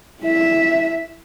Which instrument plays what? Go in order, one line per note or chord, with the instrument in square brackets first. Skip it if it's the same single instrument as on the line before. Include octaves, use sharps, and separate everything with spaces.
[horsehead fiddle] E4 E5